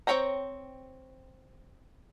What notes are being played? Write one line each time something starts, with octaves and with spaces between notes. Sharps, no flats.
C4 C5 C#5 G5 A#5